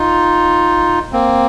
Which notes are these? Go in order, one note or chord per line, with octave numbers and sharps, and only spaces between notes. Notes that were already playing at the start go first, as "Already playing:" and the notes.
Already playing: D#4 F4
A#3 C4